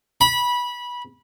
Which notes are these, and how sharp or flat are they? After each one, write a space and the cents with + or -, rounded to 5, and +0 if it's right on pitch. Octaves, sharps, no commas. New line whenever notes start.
B5 -20